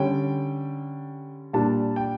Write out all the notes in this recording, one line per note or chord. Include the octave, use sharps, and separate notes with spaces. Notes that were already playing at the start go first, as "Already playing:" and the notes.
Already playing: D3 G3 C#4 G5
A#2 G3 D4 A5
G5